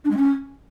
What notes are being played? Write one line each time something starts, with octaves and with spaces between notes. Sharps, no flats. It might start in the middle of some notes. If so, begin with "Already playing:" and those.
D4
G#3
C#4